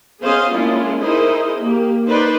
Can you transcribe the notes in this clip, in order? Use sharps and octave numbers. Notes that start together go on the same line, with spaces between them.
B3 C#4 G#4 C5 D#5 F5
G#3 A#3 C#4 D4 E4 F4
D#4 E4 G#4 A#4 C5 D#5
A#3 G4
D#4 B4 C5 D5